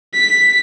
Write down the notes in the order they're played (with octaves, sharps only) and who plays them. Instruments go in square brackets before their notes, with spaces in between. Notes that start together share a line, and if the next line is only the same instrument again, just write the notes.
[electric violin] B6